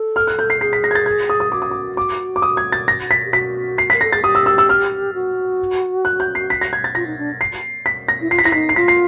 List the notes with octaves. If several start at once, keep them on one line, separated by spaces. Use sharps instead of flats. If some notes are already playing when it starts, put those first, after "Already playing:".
Already playing: A4
F6
F#6
G6
C7
G#4 C7
B6
A#6
G#6
A6
G#6
D#6
D#6
F#4 D6
D#6
D6
D6
D6
D#6
G#6
A6
A#6
B6
G4
F#4 B6
C7
A#4 B6
A4 A#6
G#4 A6
G4 D#6
E6
E6
E6
F6
F#4
F#6
G6
C7
B6
A#6
G#6
A6
F4 A#6
D#4
D4
C7
B6
A#6
E4
F4 C7
B6
E4 A#6
D#4 B6
C7
F4 B6
C7